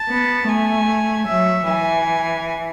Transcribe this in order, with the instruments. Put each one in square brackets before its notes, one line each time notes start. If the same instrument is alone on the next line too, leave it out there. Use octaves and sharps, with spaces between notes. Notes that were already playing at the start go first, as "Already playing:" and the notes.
Already playing: [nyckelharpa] A5
[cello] B3
[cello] A3 [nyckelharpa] G#5
[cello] F#3 [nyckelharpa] E5
[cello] E3 [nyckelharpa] G#5